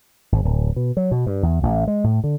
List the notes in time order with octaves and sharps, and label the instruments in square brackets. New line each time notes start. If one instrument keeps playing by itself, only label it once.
[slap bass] G#1
D1
B2
F#3
B2
G2
E2
A1
G#3
A2
D3